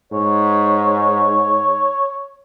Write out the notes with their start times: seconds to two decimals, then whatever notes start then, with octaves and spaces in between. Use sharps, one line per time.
0.12 G#2 C#5